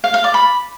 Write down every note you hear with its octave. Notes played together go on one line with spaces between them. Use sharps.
F5
F5
D5
B5